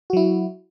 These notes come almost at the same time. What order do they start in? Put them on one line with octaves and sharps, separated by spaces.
F#4 F#3 E4